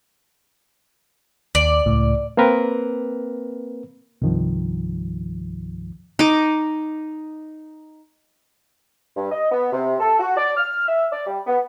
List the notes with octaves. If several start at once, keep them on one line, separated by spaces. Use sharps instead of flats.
D#2 D5
C#2 A2
A#3 C4 A#4 B4
C2 G2 D#3 F3
D#4 D6
G2
D#5
B3
C3
A4
F#4
D5
F6
E5
D5
G3
B3